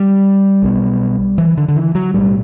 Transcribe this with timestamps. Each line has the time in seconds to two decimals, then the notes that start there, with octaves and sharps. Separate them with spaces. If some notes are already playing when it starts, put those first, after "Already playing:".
Already playing: G3
0.62 B1 B2
1.38 E3
1.57 D3
1.68 D3
1.76 E3
1.95 F#3
2.14 B1 A2 G3